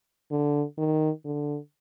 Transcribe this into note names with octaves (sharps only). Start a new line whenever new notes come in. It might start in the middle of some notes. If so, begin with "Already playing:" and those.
D3
D#3
D3